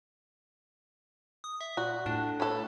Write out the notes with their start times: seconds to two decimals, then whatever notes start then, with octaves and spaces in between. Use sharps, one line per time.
1.44 D#6
1.61 E5
1.77 A#2 F#4
2.06 A2 D4
2.40 A4 B4 C#5